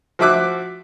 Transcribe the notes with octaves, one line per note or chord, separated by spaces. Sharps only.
F3 F#4 E5 D6 F#6